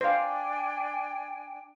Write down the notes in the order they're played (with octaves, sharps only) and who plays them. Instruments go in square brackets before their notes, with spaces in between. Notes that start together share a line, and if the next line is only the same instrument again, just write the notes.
[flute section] D4 G5 G#5 [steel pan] C5 F5